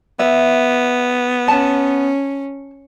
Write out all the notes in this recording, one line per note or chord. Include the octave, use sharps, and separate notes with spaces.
B3 E5
C#4 A5